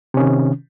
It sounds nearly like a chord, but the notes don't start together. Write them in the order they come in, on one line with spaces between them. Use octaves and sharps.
C3 C#4 D#3